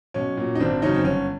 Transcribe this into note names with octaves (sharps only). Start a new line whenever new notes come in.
B1 C#4
A#2 F#3
D#4
G#1 C4 D4
F#2 C#3 F#3 C#4 D#4
C4
G1 C#4